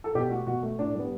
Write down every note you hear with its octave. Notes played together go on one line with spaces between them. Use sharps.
A4
B2 G4
A3 F#4
B2 F#4
A3
A2 D4
G3 B3